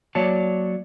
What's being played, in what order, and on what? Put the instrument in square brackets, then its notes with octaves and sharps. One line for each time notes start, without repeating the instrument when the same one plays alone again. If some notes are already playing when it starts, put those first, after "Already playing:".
[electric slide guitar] F#3 A#3 C#5 D5 A5